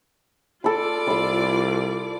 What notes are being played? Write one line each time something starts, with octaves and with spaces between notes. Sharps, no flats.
F4 A4 D5 B5 D6
C2 B5 E6